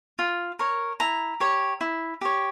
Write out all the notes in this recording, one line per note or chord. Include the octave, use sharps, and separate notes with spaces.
F4
A#4 C#5
E4 A#5
G4 C#5
E4
G4 C#5